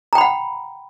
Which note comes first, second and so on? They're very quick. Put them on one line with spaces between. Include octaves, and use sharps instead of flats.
A#5 G5 B5 F#5